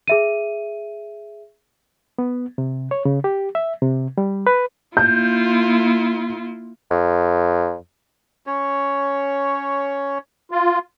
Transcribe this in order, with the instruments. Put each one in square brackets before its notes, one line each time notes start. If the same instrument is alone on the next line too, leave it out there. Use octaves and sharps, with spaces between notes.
[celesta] G#4 E5 D#7
[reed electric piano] B3
C3
C#5
C#3
G4
E5
C3
G3
B4
[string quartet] A#3 E4 F4 [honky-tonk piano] G6
[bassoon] F2
[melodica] C#4 C#5
[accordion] F4